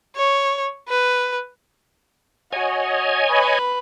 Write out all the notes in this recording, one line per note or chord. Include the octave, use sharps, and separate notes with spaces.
C#5
B4
F#4 C#5 D#5 G#5
B4